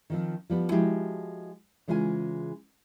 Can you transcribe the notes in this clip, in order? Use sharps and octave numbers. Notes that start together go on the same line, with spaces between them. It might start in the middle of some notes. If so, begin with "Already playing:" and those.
D#3 F3 C4
F3 G3 B3
F3 G#3 E4 F#4 G4
C#3 E3 G#3 F4 D5 G#5